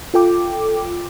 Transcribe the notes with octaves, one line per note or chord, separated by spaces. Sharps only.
F4 A4 G5 D6